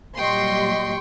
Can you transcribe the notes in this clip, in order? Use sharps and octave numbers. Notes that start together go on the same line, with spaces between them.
A#2 F#3 G3 D#5 G5 C6 C#6